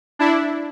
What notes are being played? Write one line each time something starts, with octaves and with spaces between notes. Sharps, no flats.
D4 E4